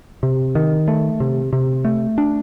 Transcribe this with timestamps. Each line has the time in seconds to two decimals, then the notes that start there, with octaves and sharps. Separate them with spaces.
0.23 C3
0.55 D#3
0.88 A3
1.20 C3
1.53 C3
1.85 A3
2.18 D4